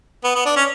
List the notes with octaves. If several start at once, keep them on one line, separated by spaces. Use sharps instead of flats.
B3
B3
D4
C#4